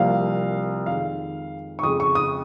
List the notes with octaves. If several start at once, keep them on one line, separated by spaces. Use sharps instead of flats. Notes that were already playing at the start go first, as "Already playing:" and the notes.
Already playing: C2 C3 F3 A#3 F5
F2 D#3 G#3 F5
C#6
F2 C#3 G#3 D#6
C#6
D#6